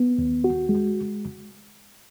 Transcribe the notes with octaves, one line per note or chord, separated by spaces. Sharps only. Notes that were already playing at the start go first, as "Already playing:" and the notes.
Already playing: B3
D#2
F#4
G#3